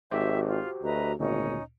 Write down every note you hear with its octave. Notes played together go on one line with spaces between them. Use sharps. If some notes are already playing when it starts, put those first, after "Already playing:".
G#1 F#4 G4 C5 E5
F4
D2 B4 D#5 A#5
G#1 D2 A#2 C#4 D#4